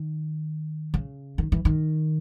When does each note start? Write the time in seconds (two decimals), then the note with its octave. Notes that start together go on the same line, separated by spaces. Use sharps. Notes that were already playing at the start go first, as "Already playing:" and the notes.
Already playing: D#3
0.94 C#3
1.38 D#3
1.52 E3
1.65 D#3